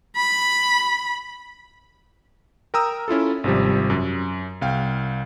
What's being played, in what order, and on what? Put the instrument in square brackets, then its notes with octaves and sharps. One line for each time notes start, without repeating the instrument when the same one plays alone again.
[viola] B5
[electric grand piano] A#4 G5 A#5 D#6 E6
C#4 E4 F4 A4
G#1 C3 F3 G3
F#2
C2 F5 G5